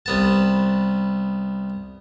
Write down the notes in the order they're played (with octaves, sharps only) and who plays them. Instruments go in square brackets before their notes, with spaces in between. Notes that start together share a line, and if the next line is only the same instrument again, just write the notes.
[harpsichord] C2 B3 A5